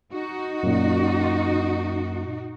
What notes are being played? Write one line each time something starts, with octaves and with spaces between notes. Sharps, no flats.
D#4 F#4
F#2 A#2